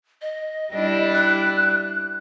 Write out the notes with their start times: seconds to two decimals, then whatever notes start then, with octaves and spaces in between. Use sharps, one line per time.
0.21 D#5
0.73 G3 D4 E4
1.14 F#6